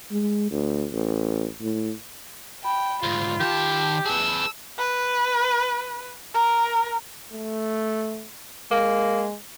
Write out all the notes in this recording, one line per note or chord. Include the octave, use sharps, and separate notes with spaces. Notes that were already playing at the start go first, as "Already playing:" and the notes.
G#3
D2
A1
A2
G5 B5
D2 G#2 F4
D#3 G4 A5
G#4 B4 A5 E6
B4
A#4
A3
G#3 A#3